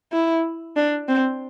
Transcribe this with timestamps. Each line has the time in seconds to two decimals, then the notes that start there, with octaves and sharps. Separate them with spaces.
0.12 E4
0.76 D4
1.08 C4